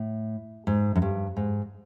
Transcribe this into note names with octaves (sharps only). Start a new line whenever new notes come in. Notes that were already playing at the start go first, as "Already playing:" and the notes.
Already playing: A2
G#2
F#2
G2
G#2